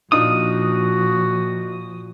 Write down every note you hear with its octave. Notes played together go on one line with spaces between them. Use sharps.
A#2 F3 D4 D#4 F4 F#4 D#6